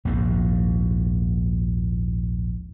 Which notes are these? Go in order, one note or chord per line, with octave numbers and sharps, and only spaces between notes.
A#1 D#2 G#2